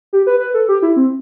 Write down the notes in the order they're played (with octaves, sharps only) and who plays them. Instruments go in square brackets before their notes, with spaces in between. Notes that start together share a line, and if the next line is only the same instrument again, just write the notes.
[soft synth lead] G4
B4
B4
A4
G4
E4
C4